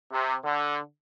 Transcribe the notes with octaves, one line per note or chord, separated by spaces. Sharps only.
C3
D3